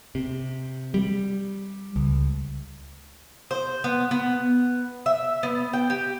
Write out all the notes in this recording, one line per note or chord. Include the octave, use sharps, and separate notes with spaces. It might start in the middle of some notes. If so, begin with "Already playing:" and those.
C3
G3
C#2
C5
B3
B3
E5
B3
G5
G4